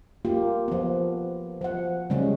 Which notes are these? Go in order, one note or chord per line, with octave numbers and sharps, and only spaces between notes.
A#3 F4 G4
F3 B3
F3 F#5
C#3 G3 G#3 C#4